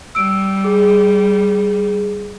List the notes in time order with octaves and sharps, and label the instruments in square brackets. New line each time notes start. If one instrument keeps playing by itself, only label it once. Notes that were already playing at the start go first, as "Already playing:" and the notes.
[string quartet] G3 [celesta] E6 D7
[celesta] G#4